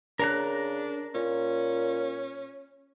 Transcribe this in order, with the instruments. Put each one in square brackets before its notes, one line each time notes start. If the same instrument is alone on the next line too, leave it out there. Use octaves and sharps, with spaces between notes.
[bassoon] C#3 [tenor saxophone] D4 [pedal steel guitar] A#4 A#5 F#6
[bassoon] A#2 [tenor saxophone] C#4